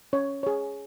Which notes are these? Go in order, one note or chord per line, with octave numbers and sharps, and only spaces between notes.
C#4 C#5
G#4 C#5